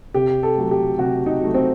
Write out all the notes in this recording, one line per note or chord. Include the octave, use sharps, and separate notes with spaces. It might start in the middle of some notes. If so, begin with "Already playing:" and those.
C3 G4
A4
F#3 A3
G4
C3 F#4
D#4
F#3 A3
C4